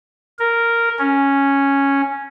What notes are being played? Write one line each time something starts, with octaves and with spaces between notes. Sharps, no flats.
A#4
C#4